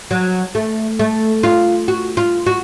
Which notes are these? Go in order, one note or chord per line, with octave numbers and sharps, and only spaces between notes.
F#3
A3
A3
F4
F#4
F4
F#4